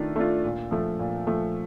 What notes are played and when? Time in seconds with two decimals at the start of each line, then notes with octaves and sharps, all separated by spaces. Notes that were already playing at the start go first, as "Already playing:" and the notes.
Already playing: D#3 A3 D4 F4
0.16 A3 D4 F4
0.44 A#2
0.71 F3 A3
0.99 A#2
1.27 F3 A3